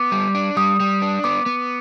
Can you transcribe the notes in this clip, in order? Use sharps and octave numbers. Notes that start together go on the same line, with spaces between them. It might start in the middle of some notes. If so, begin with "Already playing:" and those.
Already playing: B3 D6
G3
D4
G3 D#6
G3
D4
B3 D6
B3